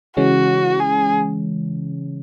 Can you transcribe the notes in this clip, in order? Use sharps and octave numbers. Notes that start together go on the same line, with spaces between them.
C#3 E3 G#3 C#4 F#4
G#4